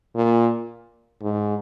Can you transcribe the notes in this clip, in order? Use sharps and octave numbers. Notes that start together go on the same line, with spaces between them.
A#2
G#2